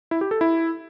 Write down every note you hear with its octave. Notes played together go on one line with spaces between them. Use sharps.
E4
G4
A4
E4